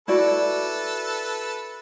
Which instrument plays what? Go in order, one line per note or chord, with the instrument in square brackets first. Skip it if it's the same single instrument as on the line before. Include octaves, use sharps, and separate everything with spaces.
[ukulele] E4 F#4 D5 [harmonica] A4 B4